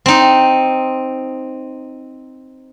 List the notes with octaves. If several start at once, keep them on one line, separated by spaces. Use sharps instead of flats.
C4 D#4